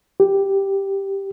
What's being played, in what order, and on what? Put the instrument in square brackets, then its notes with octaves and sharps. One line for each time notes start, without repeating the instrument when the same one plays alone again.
[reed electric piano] G4